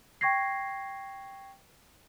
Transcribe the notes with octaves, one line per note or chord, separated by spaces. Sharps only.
G5 C#6 G#6 A#6 C7